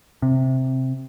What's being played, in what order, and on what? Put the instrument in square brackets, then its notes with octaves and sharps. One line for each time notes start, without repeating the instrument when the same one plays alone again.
[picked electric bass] C3